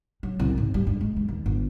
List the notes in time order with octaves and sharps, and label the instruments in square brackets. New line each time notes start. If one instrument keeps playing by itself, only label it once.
[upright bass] F#3
C2
G#1
G3
G2
G#3
E3
D#2
G1